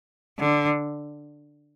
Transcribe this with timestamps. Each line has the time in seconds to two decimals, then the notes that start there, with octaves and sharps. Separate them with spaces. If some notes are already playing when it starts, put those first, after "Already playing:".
0.39 D3